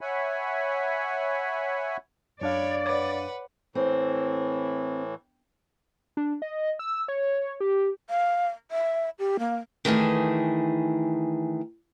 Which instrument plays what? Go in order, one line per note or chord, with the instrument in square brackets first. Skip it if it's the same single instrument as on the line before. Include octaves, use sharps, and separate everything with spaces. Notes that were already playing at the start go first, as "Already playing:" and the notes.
[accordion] C#5 E5 F#5 G#5 B5
[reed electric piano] F#2 D4 F5 [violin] C#5 B5 [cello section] D5
[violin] B4 F#5 [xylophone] C#5 D6
[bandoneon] A2 E3 [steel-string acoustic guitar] C4
[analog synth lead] D4
D#5
E6
C#5
G4
[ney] F5
E5
G4
A#3
[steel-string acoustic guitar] D#3 E3 A3 G#4